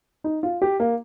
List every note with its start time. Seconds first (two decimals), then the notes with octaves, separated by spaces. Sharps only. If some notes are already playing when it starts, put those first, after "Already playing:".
0.24 D#4
0.43 F4
0.62 G4
0.80 A#3